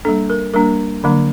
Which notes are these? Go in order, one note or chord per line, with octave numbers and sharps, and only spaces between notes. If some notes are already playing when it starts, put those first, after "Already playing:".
G3 A#3 D4 A4
A#4
G3 A#3 D4 A#4
D3 F#3 A#3 D4